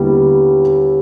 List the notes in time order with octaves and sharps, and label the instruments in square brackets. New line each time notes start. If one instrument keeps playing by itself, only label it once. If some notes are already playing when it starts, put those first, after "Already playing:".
Already playing: [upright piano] D#2 D3 G3 B3 E4